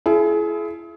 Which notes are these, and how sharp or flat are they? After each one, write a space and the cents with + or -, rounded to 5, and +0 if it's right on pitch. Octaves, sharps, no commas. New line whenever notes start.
E4 +35 G#4 +35